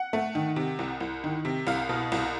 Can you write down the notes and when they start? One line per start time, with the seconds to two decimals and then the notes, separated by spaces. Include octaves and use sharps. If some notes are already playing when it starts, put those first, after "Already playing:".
Already playing: F#5
0.13 A3
0.35 D#3
0.56 C3
0.79 C2
1.00 C2
1.24 D#3
1.45 C3
1.67 C2 F5
1.89 B2
2.12 C2